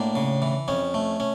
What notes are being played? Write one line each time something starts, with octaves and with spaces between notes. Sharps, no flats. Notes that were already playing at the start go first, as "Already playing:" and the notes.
Already playing: A2 A#3 D4
C#3
E3
F2 C#4
A3
C#4